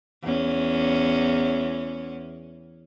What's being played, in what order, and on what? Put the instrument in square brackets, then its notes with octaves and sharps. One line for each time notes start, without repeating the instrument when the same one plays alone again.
[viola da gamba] E2 C#4